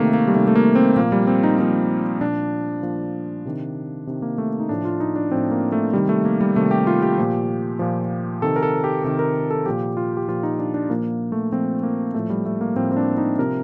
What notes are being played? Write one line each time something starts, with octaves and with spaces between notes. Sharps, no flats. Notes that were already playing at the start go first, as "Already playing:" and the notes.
Already playing: C3 D#3 A3 A#3
A#3
G3
C3 D#3 A3
A3
A#3
C4
A#2 F3 A#3
G3
C4
D#4
A#2 F3 D#4
A#2 F3 D4
A#2 F3
C3 D#3
C3 D#3
A#3
A3
D#4
A2 F3 D4
F4
D#4
D4
A2 F3 C4
A#3
A3
C3 D#3 G3
A3
A#3
G3
C3 D#3 A3
G4
F4
G4
A#2 F3
A#2 F3
C3 D#3 A4
A#4
A4
G4
C3 D#3 G4
A#4
A4
A#2 F3 G4
F4
G4
A#2 F3 F4
D#4
D4
D4
A#2 F3 A#3
A3
A#2 F3 C4
A#3
A2 F3 A3
G3
A3
A#3
A2 F3 C4
C4
D4
D#4
C3 F3 A#4